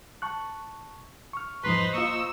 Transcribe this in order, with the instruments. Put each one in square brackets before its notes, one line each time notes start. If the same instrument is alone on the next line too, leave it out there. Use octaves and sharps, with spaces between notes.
[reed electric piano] A5 C#6 F#6
C#6 F6
[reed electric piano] E2 G#2 F3 [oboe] B4 [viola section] C5 D#5 A#5 [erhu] C6
[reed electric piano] A#3 F4 [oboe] C#6 [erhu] E6